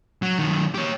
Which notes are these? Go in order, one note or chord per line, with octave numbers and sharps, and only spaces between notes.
F#3
D#3 F#3
G4 C#5